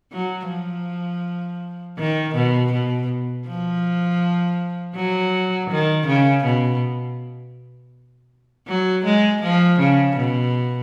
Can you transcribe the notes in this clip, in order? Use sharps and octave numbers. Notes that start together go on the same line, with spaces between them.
F#3
F3
D#3
B2
B2
F3
F#3
D#3
C#3
B2
F#3
G#3
F3
C#3
B2